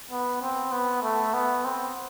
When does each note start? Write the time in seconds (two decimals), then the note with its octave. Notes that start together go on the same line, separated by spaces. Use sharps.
0.11 B3
0.42 C4
0.72 B3
1.03 A3
1.34 B3
1.65 C4